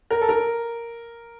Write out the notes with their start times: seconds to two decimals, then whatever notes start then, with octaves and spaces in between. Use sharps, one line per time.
0.11 A#4
0.21 A4
0.29 A#4